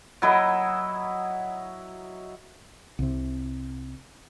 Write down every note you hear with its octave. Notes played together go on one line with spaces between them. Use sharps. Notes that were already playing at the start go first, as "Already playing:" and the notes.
F#3 E4 D#5
C2 C3